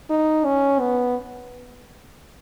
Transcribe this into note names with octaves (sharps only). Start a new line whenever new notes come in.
D#4
C#4
B3